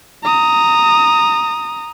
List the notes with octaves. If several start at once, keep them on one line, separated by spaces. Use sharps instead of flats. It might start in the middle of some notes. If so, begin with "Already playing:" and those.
A#5 D#6